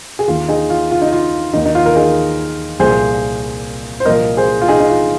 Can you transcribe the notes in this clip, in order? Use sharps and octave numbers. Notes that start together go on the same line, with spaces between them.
G#4
D#2 D#3 F4
D#4 G#4
F4
F4
D#4
F4
D#2 D#3 D#4
D#4
F4
A#4
D#4 G#4
C2 A#2 F3 G#4 C5
C5
C2 A#2 F3 A#4 D#5
G#4 C5
F4
D#4 G#4
D#4
F4